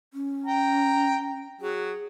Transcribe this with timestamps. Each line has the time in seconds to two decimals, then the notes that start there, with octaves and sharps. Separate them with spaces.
0.14 C#4
0.46 G5 A#5
1.61 F#3 G#4